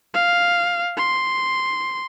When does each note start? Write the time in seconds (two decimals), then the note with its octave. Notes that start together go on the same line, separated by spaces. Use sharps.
0.14 F5
0.97 C6